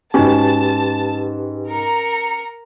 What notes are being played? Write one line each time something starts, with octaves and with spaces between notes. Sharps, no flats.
G#2 C#4 D#4 F#4 G4 B4 A5
A#4 A#5 C#7